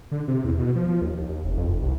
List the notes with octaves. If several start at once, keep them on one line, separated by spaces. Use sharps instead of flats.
D3
C3
E2
B2
F3
F3
D#2
D#2
F1
F2
F1
C2